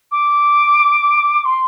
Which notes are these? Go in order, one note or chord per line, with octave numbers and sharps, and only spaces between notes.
D6
C6